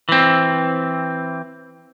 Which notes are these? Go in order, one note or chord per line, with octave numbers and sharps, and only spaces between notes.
E3 C4